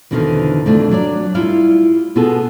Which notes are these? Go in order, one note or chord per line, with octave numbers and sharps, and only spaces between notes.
E2 B2 D3 D#3 C4 F5
F2 B2 A3 D4
F#3 D4 D5
G3 E4 F4 E5 F5
B2 B3 F4 F#4 G#4 A4